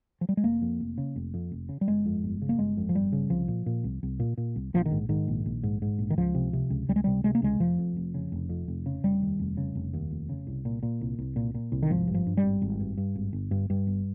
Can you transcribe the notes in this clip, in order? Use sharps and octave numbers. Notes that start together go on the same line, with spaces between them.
F3
G3
G#3
F1 A#3
F2
F1
C#3
F1
F2
F1
C#3
G3
G1 G#3
F2
G1
C#3
A#3
G1 G#3
F2
F3
G1 G3
C#3
C2 F3
A#2
A#2
C2
C2
A#2
A#2
C2
A#1 F3
D#3
G#2
G#2 D#3
A#1
A#1
G#2
G#2
A#1
D#3
C#2 F3
C3
C3
C#2
C#2 G3
G#3
C3 G3
C3 G#3
A#3
C#2 G#3
F1 F3
F2
F1
C#3
F1
F2
F1
C#3
F1 G3
D#2
F1
C#3
F1
D#2
F1
C#3
C2
A#2
A#2
C2
C2
A#2
A#2
C2
D#3
G#1 F3
G2
F3
G2
G3
G#1
G#1
G2
G2
G#1
G1
G2
G2
G1